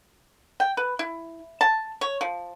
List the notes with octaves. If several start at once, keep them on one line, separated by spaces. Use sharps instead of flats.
G5
B4
E4
A5
C#5
F3